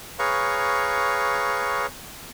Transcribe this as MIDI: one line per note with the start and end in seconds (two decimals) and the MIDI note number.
0.19 1.86 68
0.19 1.86 71
0.19 1.86 73
0.19 1.86 77
0.19 1.86 82
0.19 1.86 85